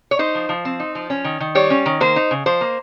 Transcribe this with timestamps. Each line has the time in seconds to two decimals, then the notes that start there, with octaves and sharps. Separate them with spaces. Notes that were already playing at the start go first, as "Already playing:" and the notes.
0.11 C#5
0.19 D#4 C5
0.35 F3
0.49 F3
0.65 C4
0.80 D#4
0.95 F3
1.10 C#4
1.24 D#3
1.40 D#3
1.55 G3 C#5
1.70 C#4
1.86 D#3
2.00 A#3 C5
2.16 D#4
2.31 C#3
2.46 F3 C5
2.61 A#3